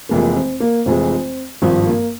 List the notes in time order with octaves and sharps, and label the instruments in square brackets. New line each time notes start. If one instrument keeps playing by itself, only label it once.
[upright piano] F1 F2 E3 G#3 [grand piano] A#3
[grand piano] C4
A#3
[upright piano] F1 F2 E3 G#3 [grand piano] C4
[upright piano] G#1 G2 F3 [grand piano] C4
[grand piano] A#3